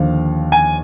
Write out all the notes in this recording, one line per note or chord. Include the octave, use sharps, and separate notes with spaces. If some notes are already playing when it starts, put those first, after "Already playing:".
Already playing: D#2 D3 F3 F5
G#5